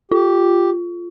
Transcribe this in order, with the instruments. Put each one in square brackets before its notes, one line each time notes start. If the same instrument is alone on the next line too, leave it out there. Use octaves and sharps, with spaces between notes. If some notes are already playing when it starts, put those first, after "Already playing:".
[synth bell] F4 [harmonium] G4